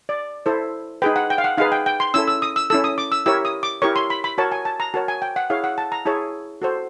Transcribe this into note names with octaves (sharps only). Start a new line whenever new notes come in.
D5
E4 A4 C5
D#4 G#4 B4 G5
F#5
G5
F5
F#5
D#4 G#4 B4 F5
G5
G5
C6
C#4 E4 A4 E6
E6
D#6
E6
C#4 E4 A4 E6
D#6
D6
E6
E4 G4 A#4 C#5 E6
D#6
D6
E4 G4 A#4 C#5 C#6
C6
B5
B5
F#4 A#4 C#5 A5
G#5
A5
A#5
F#4 A#4 C#5 A5
G#5
G5
F#5
E4 G#4 C#5 F5
F#5
A5
A#5
E4 G#4 C#5 A5
F#4 A4 C5